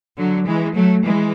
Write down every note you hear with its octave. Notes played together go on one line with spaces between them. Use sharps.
D3 F#3
E3 G#3
F#3 A3
E3 G#3